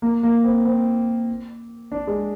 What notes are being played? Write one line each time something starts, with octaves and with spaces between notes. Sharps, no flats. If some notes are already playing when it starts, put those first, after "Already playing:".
A#3
A#3
C4
C4
D4
G#3